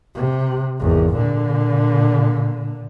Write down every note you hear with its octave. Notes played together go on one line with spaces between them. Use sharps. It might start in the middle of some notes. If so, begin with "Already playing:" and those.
C3
G#1 E2
A#2 D3